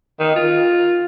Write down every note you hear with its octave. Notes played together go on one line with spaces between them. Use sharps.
D#3
F4